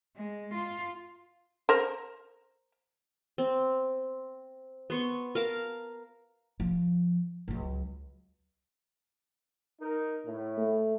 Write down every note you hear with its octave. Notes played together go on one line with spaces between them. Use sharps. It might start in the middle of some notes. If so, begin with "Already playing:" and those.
G#3
F4
A#4 C5
C4
B3 C6 C#6
A#4 F5 A5
F3
C#2 F#3
D#4 A#4
A2
A3